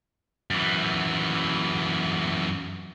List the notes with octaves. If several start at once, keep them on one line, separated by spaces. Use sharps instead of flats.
F#2 E3